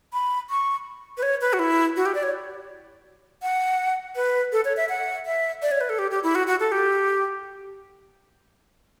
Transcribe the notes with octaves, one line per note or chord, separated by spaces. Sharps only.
B5
C#6
B4
C#5
B4
F#4
E4
F#4
G4
D5
C#5
F#5
B4
A4
C#5
E5
F#5
E5
D5
C#5
B4
A4
G4
G4
E4
F#4
F#4
A4
G4